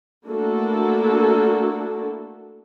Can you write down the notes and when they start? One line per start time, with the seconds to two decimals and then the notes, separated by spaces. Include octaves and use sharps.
0.26 A3 A#3 D4 E4 F#4 A4